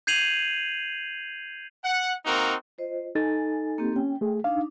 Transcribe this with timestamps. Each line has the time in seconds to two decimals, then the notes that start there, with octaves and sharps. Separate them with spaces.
0.07 G6 G#6 C7 D#7 F7 F#7
1.84 F#5
2.26 A#3 C4 D#4 F#4 A#4
2.78 F4 C5 D#5
3.15 D#4 A4 G#5 A6
3.78 A#3 C4 G4
3.96 C#4 G5
4.21 A3 G#4
4.44 D4 D#4 F5